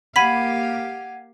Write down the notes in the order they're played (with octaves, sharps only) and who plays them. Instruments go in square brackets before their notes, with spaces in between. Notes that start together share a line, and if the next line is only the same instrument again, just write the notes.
[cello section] A#3 G4 F5 [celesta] F#5 G#6 D#7 [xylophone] B5 B6